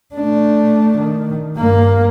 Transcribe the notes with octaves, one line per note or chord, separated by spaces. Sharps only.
A3 D4
D#3
G2 A#3